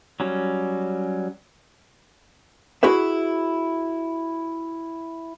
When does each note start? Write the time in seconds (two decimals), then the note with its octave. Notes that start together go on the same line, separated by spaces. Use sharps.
0.20 F#3 G3 C#4
2.83 E4 F#4 G#4 B4 E5